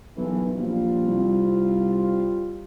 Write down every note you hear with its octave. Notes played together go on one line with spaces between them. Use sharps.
B1 G2 D#3 E3
A#1 G3 C4 F4
C2